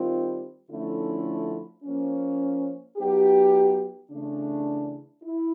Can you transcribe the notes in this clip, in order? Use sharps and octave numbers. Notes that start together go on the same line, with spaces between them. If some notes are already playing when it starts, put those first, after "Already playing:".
Already playing: D#3 G3 C4 F4
D3 F3 A3 C#4 E4
F3 A#3 C#4
F#3 B3 D#4 G4
C#3 E3 A3 D4
E4